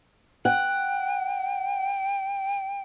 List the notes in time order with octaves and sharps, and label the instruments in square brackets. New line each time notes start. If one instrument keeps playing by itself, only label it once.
[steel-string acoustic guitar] F#5 [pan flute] G5